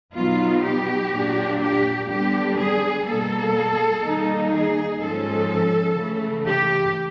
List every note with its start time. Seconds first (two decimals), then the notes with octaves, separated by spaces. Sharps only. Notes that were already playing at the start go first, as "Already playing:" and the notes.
0.14 B2 F#3 B3 D#4 F4
0.63 G4
1.12 A#2 F#3 A#3 D4
1.60 G4
2.08 D3 G3 B3 D4 G4
2.57 G#4
3.06 B2 G3 A#3 A4
4.02 D#3 G3 A#3 D#4
4.51 G#4
5.00 G#2 F3 G#3 C#4 A4
5.97 C#3 E3 A3
6.46 G4